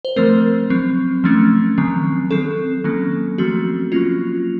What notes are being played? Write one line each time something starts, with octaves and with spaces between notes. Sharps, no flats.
C5
F3 A3 C4 A#4
F#3 C4
F3 A3 C#4
D#3 F#3 C4
F#3 C4 A4
D#3 F#3 A#3 C#4
F3 A3 C4 F#4
F#3 A#3 C#4 F4